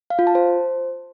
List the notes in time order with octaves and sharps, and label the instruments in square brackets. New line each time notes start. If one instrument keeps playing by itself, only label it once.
[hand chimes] F5
F4
A5
C5